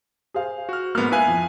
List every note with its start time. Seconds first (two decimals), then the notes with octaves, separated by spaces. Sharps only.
0.34 G#4 C5 F5
0.69 F#4 F6
0.95 G#2 A#3 B3 F6
1.12 E4 B4 F5 G#5 F#6
1.28 F2